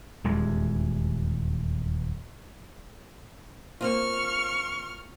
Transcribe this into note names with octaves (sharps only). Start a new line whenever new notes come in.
D#1 E2 G#3
A#3 C4 F4 C#6 F6